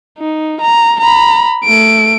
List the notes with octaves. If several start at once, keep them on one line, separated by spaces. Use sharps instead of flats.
D#4
A#5
A#5 B5
A3 D7